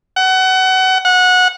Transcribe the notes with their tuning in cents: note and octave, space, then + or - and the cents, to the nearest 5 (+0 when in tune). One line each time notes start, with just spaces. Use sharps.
F#5 +25
F#5 -20